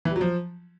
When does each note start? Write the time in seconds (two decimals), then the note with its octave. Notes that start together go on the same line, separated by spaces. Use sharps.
0.05 E3
0.11 G3
0.16 F#3
0.21 F3